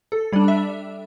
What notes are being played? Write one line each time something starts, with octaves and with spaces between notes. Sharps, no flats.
A4
G3 D4 D5
E5